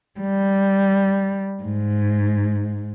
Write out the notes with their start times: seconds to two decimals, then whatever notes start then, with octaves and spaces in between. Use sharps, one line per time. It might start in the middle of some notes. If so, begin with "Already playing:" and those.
0.20 G3
1.63 G#2